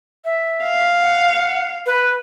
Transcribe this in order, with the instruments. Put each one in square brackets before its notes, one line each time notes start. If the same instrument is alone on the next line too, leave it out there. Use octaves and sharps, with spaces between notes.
[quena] E5
[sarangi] F5
[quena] F#5
B4